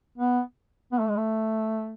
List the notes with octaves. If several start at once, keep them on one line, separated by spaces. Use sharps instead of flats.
B3
B3
A3
G#3
A3